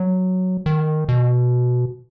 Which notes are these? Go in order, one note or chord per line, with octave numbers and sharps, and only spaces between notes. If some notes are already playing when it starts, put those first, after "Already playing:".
Already playing: F#3
D#3
B2